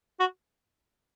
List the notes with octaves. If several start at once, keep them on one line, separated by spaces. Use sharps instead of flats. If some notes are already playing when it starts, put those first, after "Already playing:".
F#4